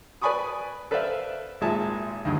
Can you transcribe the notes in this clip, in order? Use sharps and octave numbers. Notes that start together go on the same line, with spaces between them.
B4 D5 G#5 B5 C#6 D#6
A4 B4 C5 D5 E5 F5
G#1 A#2 G#3 E5 A5
D2 G2 D#3